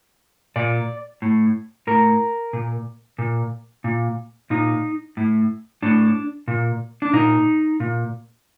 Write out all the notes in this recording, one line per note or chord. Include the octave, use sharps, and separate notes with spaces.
A#2 D5
A2
A2 A#4
A#2
A#2
A#2
A#2 D#4
A2
A2 D4
A#2
D4
A#2 D#4
A#2